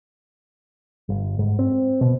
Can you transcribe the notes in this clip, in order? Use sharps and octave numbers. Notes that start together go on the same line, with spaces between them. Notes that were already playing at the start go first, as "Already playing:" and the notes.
G1
G#2
C4
B2